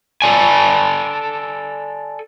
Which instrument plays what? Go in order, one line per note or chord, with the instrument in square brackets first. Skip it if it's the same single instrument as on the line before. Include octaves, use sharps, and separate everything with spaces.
[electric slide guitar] A4 D5 G#5